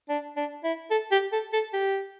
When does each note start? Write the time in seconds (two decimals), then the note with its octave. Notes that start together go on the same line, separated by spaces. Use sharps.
0.09 D4
0.36 D4
0.64 E4
0.91 A4
1.12 G4
1.32 A4
1.53 A4
1.73 G4